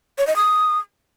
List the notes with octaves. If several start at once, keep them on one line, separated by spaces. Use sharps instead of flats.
C#5
D#5
D#6